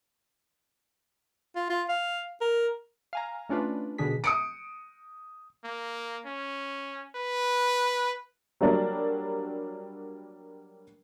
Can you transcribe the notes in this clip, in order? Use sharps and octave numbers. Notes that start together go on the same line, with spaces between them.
F4
F4
F5
A#4
F5 G#5 A#5
A3 C#4 D4 F4 B4
B2 D3 D#3 D4 G#4 B6
D#6 C#7 D7
A#3
C#4
B4
F#3 G3 A#3 D4 A#4